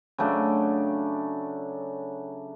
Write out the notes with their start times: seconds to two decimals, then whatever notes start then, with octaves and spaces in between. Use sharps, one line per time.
0.18 C#3 F#3 A3 D4